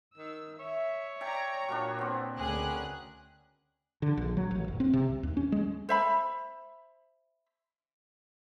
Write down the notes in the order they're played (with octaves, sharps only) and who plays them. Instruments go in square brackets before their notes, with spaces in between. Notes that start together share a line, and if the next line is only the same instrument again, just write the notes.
[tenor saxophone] D#3 [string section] E6
[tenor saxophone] C#5 [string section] E5
[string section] D5 A#5 [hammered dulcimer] E5 G5 G#5
[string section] A#2 [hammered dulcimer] F#3 A#3 D4
[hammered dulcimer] B3 C4
[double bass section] D2 [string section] C#4 G#4 F#6 [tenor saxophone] A#4
[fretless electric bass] D3
A#1
F#3
A1
F#1
C4
C3
C2
D#2
C#4
G#3
[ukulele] C5 E5 B5